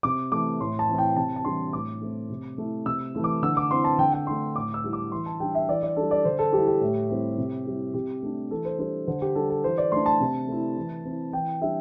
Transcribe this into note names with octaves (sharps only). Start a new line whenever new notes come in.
C3 D6
E3 A3 D6
A2 C6
A5
E3 C4 E4
G5
C3 A5
A5
E3 G3 D4 C6
A2 D6
A3 C4
C3
A3 E4
C3 E6
E3 A3 E4
D6
D3 E6
D6
C4 E4 C6
A5
D3 G5
G5
A3 D4 C6
A2 D6
E6
G3 E4
D6
E3 C6
A5
G3 D4 G5
E5
E3 D5
D5
G3 D4 A4
D5
D3 C5
A4
G3 E4 G4
G4
A2
G3 C4 E4
C3
G3 E4
C3 G4
A3 D4
E3 A4
C5
G3 D4 C5
D3 C5
G4
G3 D4 A4
A4
E3 C5
D5
A3 D4 C6
A5
C3
A3 E4
E3
C4 E4
E3 G5
G3 D4 E5